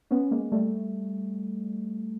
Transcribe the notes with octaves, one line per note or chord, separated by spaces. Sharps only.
B3 C#4
G#3 A#3
G3 A3